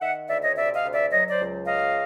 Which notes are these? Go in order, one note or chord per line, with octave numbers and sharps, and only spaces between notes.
D#3 E5 F#5
D2 D5 E5
C#5 D#5
C3 D5 E5
D#5 F5
D2
D5 E5
F#3 C#5 D#5
C5 D5
C#2
C#3 D#5 F5